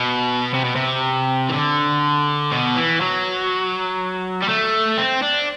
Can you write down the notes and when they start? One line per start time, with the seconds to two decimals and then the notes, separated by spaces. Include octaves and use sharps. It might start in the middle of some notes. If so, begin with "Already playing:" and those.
Already playing: B2
0.54 C3
0.65 B2
0.76 C3
1.49 E3
1.53 D3
2.51 B2
2.76 E3
3.01 F#3
4.42 G3
4.49 A3
4.98 C4
5.23 D4